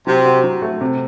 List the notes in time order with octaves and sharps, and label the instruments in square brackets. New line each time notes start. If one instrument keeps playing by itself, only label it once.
[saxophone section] C3 [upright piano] F#3
[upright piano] F#4
F#3
A3
C3